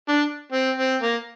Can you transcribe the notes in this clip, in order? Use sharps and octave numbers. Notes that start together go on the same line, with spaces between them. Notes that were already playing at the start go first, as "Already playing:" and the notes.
D4
C4
C4
A#3